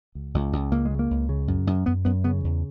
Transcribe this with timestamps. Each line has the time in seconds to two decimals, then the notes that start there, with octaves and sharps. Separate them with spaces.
0.15 C#2
0.34 C#2
0.53 C#2
0.71 C#2 A#3
0.85 G#3
0.91 C#3
0.99 A#3
1.10 C#2
1.29 C#3
1.48 F#2
1.67 F#2
1.86 F#2 B3
2.05 F#2 B3
2.24 C#3 B3
2.44 E2